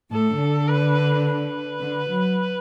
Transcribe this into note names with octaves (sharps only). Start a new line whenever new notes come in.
A2 A4
D3
B4
B4
D3
F#3